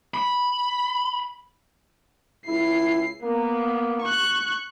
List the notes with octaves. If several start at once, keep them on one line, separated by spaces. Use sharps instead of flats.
B5
C#2 E4 C7
A#3 B3
C#6 F#6